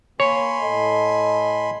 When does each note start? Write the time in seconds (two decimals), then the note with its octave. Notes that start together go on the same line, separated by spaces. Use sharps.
0.20 A#3 C#5 G#5 B5 C6
0.60 A2 A4 D#5